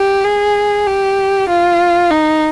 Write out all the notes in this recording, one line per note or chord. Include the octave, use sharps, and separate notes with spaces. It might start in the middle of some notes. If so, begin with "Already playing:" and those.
Already playing: G4
G#4
G4
F4
D#4